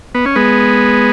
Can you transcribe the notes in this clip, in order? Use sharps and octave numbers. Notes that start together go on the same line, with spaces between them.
B3
C#4
G#3 B3